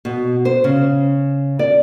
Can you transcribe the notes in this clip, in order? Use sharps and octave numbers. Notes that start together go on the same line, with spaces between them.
B2
C5
C#3
D5